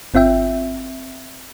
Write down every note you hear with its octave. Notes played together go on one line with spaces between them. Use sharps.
G1 C4 F4 E5 G5